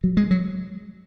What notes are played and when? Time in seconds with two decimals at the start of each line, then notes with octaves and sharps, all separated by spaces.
0.04 F#3
0.17 G#3
0.31 F#3